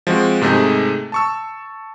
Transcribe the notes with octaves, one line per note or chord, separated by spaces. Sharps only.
F3 G#3 C4 F#4
G#2 C3 A3 D#4 G#4
A5 C#6 E6